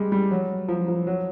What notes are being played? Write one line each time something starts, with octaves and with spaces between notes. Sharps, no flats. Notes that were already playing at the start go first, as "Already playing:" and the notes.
Already playing: G3 G#3
G3
F#3
F3
F3
F#3